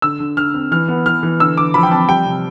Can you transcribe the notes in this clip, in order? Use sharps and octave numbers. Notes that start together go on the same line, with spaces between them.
D3 E6
D3
D3 F6
C4
E3 F6
B3
E3 F6
E3
D3 E6
D3 D6
F3 B5
G5
C4 A5
G3 G5
C3